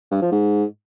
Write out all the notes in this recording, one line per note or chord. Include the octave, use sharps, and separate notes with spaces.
G2
F3
G#2